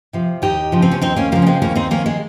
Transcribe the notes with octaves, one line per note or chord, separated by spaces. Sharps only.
C3 F3
D#2 D#4 G4
C#3 F3
C4
C#4
D#2 C4 D#4
A#3 C#4
C#3 F3 G3 A#3
C#4
G#3 C4
D#2 A#3 C#4
C4 D#4
D#3 A#3 C#4
G#3